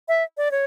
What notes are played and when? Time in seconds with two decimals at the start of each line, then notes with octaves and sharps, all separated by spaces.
0.08 E5
0.37 D5
0.51 C#5